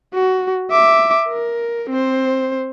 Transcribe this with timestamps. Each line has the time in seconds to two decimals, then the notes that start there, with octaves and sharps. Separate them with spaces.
0.14 F#4
0.71 E5 D6
1.29 A#4
1.90 C4 C5